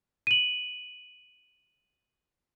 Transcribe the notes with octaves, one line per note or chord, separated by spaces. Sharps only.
D#7 F#7